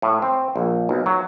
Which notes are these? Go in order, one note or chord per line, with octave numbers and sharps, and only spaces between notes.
A2
C4
A#1
B1
F#3